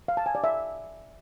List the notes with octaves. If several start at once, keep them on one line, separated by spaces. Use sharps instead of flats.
F5
A5
G#5
D5
E5